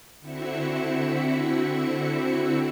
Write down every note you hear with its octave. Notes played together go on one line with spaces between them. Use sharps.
D3 C4 E4 F#4 E5 C#7